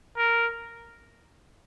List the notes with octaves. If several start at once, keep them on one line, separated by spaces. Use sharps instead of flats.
A#4